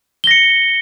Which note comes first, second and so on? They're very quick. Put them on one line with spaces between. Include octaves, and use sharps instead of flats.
G7 A#6 C#7